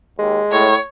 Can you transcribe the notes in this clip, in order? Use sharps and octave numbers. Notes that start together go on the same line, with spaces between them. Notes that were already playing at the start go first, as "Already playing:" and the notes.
D#2 G#3
A2 C#5